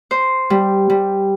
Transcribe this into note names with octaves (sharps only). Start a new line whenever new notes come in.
C5
G3
G3